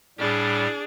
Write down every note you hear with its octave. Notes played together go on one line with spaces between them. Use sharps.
A2 G3 D4 G#4